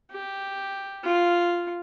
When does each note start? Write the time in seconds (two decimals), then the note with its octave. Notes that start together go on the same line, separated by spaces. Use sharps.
0.11 G4
1.04 F4